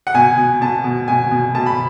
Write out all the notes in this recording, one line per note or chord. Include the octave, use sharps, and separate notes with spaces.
F#5
B2 G#5
B2
B2 A5
B2
B2 G#5
B2
B2 A5
B5